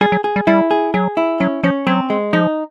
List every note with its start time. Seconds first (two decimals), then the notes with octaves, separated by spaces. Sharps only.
0.01 G3 G#4
0.12 F#3
0.24 G#4
0.36 G3
0.47 G3 E4
0.71 G#4
0.94 F#3 G#4
1.17 E4
1.40 F#3 C#4
1.63 F3 C#4
1.87 F#3 C4
2.10 G#3
2.33 F3 D#4